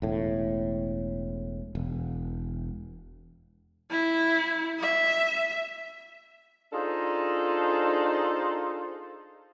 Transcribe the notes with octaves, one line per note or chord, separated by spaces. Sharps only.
E1 A2
E1
E4
E5
D4 D#4 F4 G#4 A4 C5